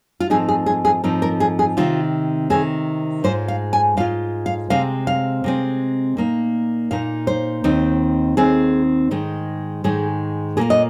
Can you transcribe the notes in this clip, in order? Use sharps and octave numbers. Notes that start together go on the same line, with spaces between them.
F4
G#2 F3 C4 D#4 G#4
G#4
G#4
G#4
G#2 F3 C4 D#4 A#4
A#4
G#4
G#4
C3 D#3 C4 F4
C3 D#3 C4 G#4
G#2 G#3 F4 C5
F5
G#5
G#2 G#3 F4 F5
F5
C3 G#3 C4 F5
F5
C3 G#3 C4
A#2 A#3 D#4
A#2 A#3 D#4 F5
C5
D#2 D#3 C4 D#4
D#2 D#3 C4 D#4 G#4
G#2 D#3 G#3
G#2 D#3 G#3 G#4
A#2 A#3 F4 G#4
D#5